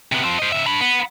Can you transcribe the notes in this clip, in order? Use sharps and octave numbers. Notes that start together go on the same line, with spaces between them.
C3 B3
F3 C4
C5 D#5
C#3 E5
D4 B5
B3